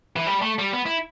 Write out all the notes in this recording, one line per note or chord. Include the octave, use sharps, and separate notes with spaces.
E3
G3
A3
G3
B3
E4